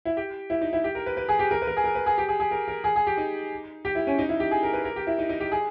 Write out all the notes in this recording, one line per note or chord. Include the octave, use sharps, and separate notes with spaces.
E4
G4
E4
D#4
E4
G4
A#4
B4
B4
G#4
G4
A#4
B4
A#4
G#4
A#4
B4
G#4
G4
G#4
G#4
A#4
A#4
G#4
G#4
G4
D#4
G4
E4
C#4
D#4
E4
G4
G#4
A#4
B4
A#4
G4
E4
D#4
D#4
G4
G#4